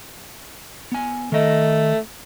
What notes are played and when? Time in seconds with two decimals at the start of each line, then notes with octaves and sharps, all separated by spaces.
0.92 B3 G#5
1.32 D#3 A3 D#5